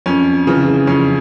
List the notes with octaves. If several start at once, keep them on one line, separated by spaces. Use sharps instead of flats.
F2 C#4
C#3 E3
F2 C#4